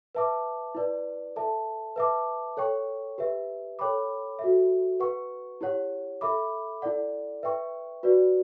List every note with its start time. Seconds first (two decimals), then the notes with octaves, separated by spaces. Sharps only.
0.15 B4 E5 A5 D6
0.75 E4 B4 D5
1.36 A4 E5 A5
1.96 B4 E5 A5 D6
2.57 A4 C#5 G5 C#6
3.18 G4 B4 E5
3.79 A4 C#5 G5 B5 D6
4.39 F#4 A4 E5
5.00 B4 F#5 C#6
5.61 E4 G4 C#5 F#5
6.21 A4 E5 B5 D6
6.82 E4 A4 D5 F#5
7.43 B4 E5 G5 C#6
8.03 F#4 B4 D5